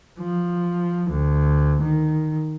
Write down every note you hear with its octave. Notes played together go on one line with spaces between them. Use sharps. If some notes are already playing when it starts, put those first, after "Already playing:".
F3
D2
D#3